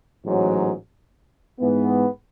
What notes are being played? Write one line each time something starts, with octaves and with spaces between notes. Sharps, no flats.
A1 G#2 F#3
G#2 E3 B3